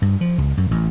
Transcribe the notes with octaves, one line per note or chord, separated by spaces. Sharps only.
G2
F3
C#2
F#2
A1